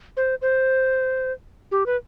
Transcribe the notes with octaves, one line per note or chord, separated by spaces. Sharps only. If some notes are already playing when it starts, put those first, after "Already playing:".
C5
C5
G4
B4